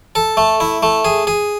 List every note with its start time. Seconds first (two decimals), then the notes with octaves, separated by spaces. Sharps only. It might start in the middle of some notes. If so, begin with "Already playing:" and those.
0.15 A4
0.37 A3
0.60 E4
0.83 A3
1.05 G#4
1.27 G#4